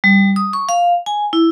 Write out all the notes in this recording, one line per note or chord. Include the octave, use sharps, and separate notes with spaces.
G3
D#6
C#6
F5
G#5
E4